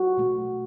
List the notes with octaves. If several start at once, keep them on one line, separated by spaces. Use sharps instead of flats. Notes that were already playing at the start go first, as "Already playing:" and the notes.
Already playing: F#4
B2 A3